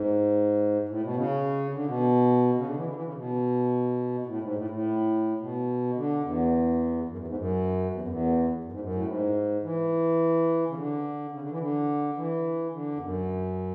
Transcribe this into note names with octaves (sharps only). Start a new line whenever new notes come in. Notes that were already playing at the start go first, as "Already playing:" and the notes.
Already playing: G#2
A2
B2
C#3
D3
B2
C#3
D3
E3
D3
E3
C#3
B2
B2
A2
G#2
A2
A2
B2
D3
E2
F#2
E2
G#2
F#2
E2
F#2
E2
F#2
G#2
F#2
A2
G#2
E3
C#3
D3
C#3
D3
E3
D3
E3
D3
E2
F#2